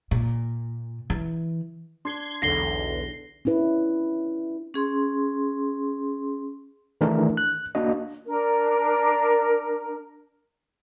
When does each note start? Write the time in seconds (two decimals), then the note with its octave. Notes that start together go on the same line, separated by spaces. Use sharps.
0.11 A#2
1.10 E3
2.05 D4 C6 G#6
2.42 B1 E2 D3 A#6 C7 G7
3.45 C#4 D4 E4 B4
4.74 C#4 G#4 C6
7.01 D#3 E3 A3 D4 G#4 A#4
7.37 F#6
7.75 A#3 D4 F#4 D#5
8.27 D4 A#4